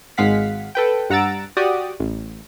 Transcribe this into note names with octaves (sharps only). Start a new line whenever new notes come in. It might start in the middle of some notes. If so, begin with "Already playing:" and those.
G#1 G#3 F5 F#5 B6
A4 B4 G5
G2 F#5 A#5 E6 A6 D7
F#4 G4 D5 D#6
A1